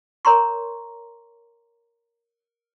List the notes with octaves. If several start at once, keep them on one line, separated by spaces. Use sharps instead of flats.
A#4 C#5 A#5 C6 C#6